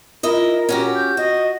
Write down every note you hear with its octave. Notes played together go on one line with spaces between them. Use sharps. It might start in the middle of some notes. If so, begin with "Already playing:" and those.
E4 F4 A#4 D#5
C#4 F#4 G4
G6
F#4 D#5